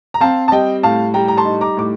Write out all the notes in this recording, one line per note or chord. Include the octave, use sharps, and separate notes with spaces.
A#5
C4 F5 A5
A5
G3 D#5 G5
A2 F5 A5
G3 G5 A#5
A#5
A5 C6
D#4
A#5 D6
A2 D6